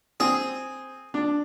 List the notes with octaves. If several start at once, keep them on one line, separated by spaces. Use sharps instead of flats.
C4 G#4
D4